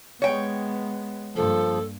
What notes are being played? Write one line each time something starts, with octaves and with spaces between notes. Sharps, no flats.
G#3 B3 C#5 G5
G2 F3 A#3 A4